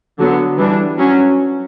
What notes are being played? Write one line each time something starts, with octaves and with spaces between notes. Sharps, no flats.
D3 F#3 B3
E3 G3 D4
F#3 C#4